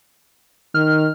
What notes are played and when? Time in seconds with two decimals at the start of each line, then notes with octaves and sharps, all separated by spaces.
0.74 D#3 F6